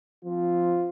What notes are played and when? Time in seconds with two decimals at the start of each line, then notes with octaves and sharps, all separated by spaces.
0.25 F3 C4 F4